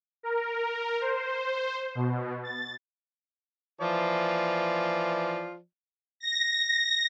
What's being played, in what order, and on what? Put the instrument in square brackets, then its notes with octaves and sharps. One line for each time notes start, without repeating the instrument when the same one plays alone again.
[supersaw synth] A#4
C5
B2
A6
[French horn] E3 [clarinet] F3 [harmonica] F4 D5
[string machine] A#6